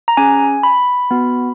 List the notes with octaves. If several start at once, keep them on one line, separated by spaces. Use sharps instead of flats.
A#5
C#4 G#4 G#5
B5
B3 F#4